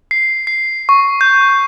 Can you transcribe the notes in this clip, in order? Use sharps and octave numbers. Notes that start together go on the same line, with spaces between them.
C7
C7
C#6
G6